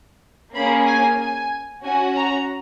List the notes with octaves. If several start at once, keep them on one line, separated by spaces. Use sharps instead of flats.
A#3 C#4 G#4 B5
G#5
G#5
C#4 F#4 G#5
A#5